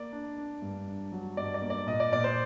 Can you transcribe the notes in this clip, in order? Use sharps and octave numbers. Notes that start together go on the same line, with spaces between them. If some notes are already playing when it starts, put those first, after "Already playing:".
Already playing: A#3 D5
D4
D4
G2
D4
F#3
G2 D5
D5
A#3
D5
A#2 D#5
D5
A#2 D5
C5